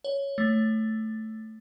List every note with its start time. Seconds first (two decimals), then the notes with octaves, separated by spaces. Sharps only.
0.04 C#5
0.38 A3